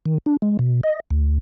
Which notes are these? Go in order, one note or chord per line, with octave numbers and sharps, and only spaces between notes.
D#3
D4
G#3
B2
D#5
D2